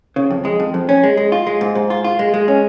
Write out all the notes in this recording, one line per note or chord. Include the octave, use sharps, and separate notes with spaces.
C#3
F2
G#3
F2
F2
C#4
G#3
G#3
F4
G#3
G#2
G#2
F4
F4
G#3
G#3
C#4